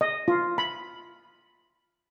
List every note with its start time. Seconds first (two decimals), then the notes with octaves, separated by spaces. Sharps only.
0.01 D#5
0.28 F4
0.58 B5